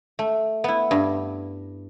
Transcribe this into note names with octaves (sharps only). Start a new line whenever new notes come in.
A3
B3 E4
G2